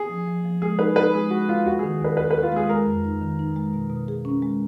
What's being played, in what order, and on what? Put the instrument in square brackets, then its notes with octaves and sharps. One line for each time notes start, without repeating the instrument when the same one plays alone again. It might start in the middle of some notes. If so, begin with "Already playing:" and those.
Already playing: [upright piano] G#4
[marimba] F3
F3
F3
[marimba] G#3 [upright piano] G#4
[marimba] D#4 [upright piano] B4
[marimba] D#4 [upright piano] B4
[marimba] G#3 [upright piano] G#4
[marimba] G#3 [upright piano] F#4
[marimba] G#3 [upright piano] F4
[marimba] D#2 [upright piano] F#4
[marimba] D#3 [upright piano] G#4
[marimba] D#2 [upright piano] B4
[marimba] D#2 [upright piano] B4
[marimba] D#2 [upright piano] B4
[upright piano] F4
[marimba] G#3 [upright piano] G#4
[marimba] G#3 [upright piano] A#4
[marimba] F2
D#4
D#3
D#4
G#3
B2
B2
G#4
C#4
G#3